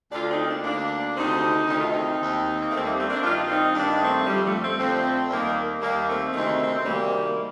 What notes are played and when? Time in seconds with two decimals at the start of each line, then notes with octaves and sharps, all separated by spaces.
0.12 D2 D3 D4 F4
0.29 C4 D#4
0.46 A#3 D4
0.63 D2 D3 A#3 D4
1.15 D2 C3 D#3 C4 D#4
1.67 D2 C3 D#3 D#4
1.78 F4
1.88 C4 D#4
2.19 D#2 D#3
2.61 A#3
2.71 D#2 D#3 A3 C4
2.84 G3 A#3
2.97 A3 C4
3.10 A#3 D4
3.23 G2 D#3 D4 F4
3.41 F4
3.48 C4 D#4
3.74 G2 D#3 A#3 D4
4.01 A3 C4
4.27 F2 D3 G3
4.44 F3 A3
4.61 A3 C4
4.78 F2 D3 A3 C4
5.30 D#2 D#3 G3 A#3
5.81 D#2 D#3 G3 A#3
6.08 A3 C4
6.33 D2 C3 D#3 A3 C4
6.59 A3 C4
6.76 C4
6.85 D2 C3 D#3 G3 A#3